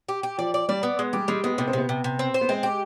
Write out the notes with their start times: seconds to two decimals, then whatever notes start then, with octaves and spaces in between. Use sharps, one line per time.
0.09 G4
0.23 G4
0.38 F3 D5
0.54 D5
0.69 G3 D5
0.83 B3
0.99 G#3
1.13 G3 G4
1.28 G3 G#3
1.44 G#3 B3
1.58 C3 B3
1.68 C4
1.73 C3 B3
1.89 C3
2.04 C3
2.19 C4
2.34 C5
2.41 B3
2.49 G#3 C4
2.63 G4